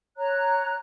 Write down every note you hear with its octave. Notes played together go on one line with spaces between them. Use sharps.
C#5 A#5 F#6